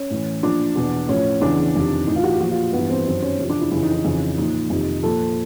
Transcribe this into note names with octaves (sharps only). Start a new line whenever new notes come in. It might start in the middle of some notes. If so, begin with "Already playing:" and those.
Already playing: C#4
A2 E3
A#2 F3 D4
E2 B2
A2 F3 C#4
E2 C#3 E3 D4
F2 C3 D#3
A2 E3 D#4
F4
F#4
G4
A#2 F3 F#4
F4
G2 E3 B3
C4
F#2 D#3 C4
C#4
E2 C3 F3
D4
E4
F2 C#3 E3 E4
D#4
D#4
F2 C#3 E3
A#2 F3 D#4
F2 C3 D#3
A#2 F3 A4